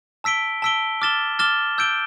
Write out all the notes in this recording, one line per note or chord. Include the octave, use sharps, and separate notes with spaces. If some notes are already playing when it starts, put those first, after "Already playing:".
A5 E6 B6 D7 G7
A5 E6 B6 D7 G7
D6 F6 A6 E7 G7
D6 F6 A6 E7 G7
E6 G6 D7 G7